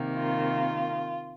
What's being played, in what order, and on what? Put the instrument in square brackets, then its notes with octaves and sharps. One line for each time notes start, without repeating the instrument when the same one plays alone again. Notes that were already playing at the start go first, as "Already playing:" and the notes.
Already playing: [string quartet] C3 D#3 A#3
F4